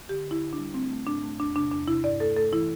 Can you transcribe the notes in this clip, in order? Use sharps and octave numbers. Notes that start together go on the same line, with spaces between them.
D3 G4
D3
E4
D3
D4
G3
A3 C4
A3
A2 D4
A3
E2 D4
C3 D4
E2 D4
C3 E4
G2 D5
A3 A4
A3 A4
E3 E4